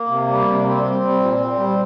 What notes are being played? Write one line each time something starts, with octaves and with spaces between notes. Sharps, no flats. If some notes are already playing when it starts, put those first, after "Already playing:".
Already playing: A#3
C3
G3
C3
D4
G3 C4
G3
G3
A#2
A#2
G3